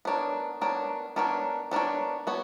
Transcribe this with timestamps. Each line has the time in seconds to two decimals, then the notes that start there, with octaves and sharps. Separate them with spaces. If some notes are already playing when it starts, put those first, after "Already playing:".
0.05 B3 D4 A#4 C#5
0.61 B3 D4 A#4 C#5
1.16 B3 D4 A#4 C#5
1.71 B3 D4 A#4 C#5
2.27 B3 F#4 C#5